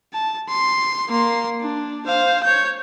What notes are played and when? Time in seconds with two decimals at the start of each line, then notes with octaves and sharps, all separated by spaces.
0.14 A5
0.49 C6
1.09 A#3 C6
1.61 D4
2.06 C5 F5
2.44 C#5 G6